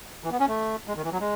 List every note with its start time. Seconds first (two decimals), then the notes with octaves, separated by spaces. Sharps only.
0.24 E3
0.32 B3
0.40 C#4
0.48 A3
0.88 G#3
0.96 D#3
1.04 E3
1.12 F#3
1.20 G#3